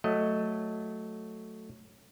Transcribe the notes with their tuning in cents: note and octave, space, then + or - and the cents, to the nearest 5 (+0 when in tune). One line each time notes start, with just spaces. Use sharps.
F#3 +0 A3 +0 D#5 +0